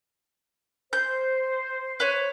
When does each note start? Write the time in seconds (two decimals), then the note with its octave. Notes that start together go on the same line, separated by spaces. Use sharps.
0.93 C5 G6
2.00 B4 C#5